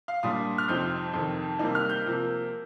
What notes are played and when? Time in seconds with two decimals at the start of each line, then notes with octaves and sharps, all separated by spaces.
0.08 F5
0.23 A#2 G3 D4 D#6
0.58 F6
0.68 F2 C3 F3 C4 D#4 G6
1.13 F2 C3 D#3
1.59 C3 G3 A#3 D#4
1.75 F6
1.90 G6
2.06 C3 F3 A#3